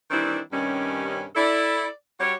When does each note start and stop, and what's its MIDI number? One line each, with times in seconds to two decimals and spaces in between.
0.11 0.39 51
0.11 0.39 52
0.11 0.39 55
0.11 0.39 60
0.11 0.39 62
0.11 0.39 64
0.52 1.24 43
0.52 1.24 48
0.52 1.24 51
0.52 1.24 55
0.52 1.24 61
1.36 1.87 64
1.36 1.87 69
1.36 1.87 74
2.20 2.34 55
2.20 2.34 66
2.20 2.34 67
2.20 2.34 73